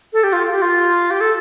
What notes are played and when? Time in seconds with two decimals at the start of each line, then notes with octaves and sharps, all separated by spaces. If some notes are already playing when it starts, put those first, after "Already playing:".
0.13 A4
0.24 G4
0.33 F4
0.52 G4
0.62 F4
1.11 G4
1.21 A4